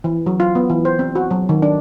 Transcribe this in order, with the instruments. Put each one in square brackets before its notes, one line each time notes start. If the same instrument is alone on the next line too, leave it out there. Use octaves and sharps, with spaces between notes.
[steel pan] E3
F#3
F4
B3
E3
C5
C4
F#4
F#3
D#3
D4